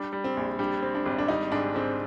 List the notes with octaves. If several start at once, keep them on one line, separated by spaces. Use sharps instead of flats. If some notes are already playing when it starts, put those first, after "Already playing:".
Already playing: G3 D4
G3
C4
A#1
G3 D4
C4
D4
G#1
D4
G3 D#4
G#2 D4
G#2 C4